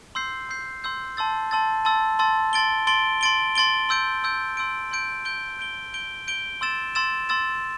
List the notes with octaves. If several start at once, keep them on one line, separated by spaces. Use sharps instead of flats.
C6 E6 G6 C7
C6 E6 G6 C7
C6 E6 G6 C7
A5 C6 E6 A6
A5 C6 E6 A6
A5 C6 E6 A6
A5 C6 E6 A6
C6 A6 D7 G7
C6 A6 D7 G7
C6 A6 D7 G7
C6 A6 D7 G7
C6 E6 G6 D7
C6 E6 G6 D7
C6 E6 G6 D7
C6 E6 G6 D7
G6 D7 G7
G6 D7 G7
G6 D7 G7
G6 D7 G7
C6 E6 A6 E7
C6 E6 A6 E7
C6 E6 A6 E7